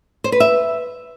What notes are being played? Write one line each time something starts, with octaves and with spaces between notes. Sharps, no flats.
C5
B4
E5